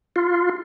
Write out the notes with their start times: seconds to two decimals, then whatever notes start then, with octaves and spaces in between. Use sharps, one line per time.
0.16 F4